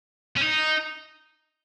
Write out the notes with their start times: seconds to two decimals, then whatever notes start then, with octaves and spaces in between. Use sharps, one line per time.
0.37 C#4
0.41 D#4